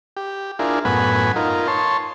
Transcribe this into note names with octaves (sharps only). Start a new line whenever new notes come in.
G4
D4 E4 F4 G#4 A#4
F#2 A2 B3 F#5 G#5 B5
D#4 F4 A#4
C#5 A5 C6